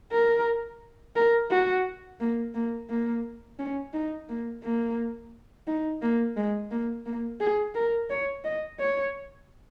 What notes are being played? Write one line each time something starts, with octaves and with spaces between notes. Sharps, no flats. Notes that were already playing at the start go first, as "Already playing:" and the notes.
A#4
A#4
F#4
A#3
A#3
A#3
C#4
D#4
A#3
A#3
D#4
A#3
G#3
A#3
A#3
G#4
A#4
C#5
D#5
C#5